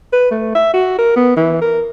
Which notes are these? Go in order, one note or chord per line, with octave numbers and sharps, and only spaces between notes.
B4
A3
E5
F#4
A#4
B3
E3
A#4